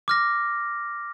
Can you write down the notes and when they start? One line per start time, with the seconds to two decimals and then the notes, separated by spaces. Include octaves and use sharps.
0.08 D6 F6 A#6